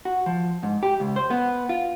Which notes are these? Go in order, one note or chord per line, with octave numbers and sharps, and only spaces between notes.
F#4
F3
G#2
G4
C#2
C5
B3
F4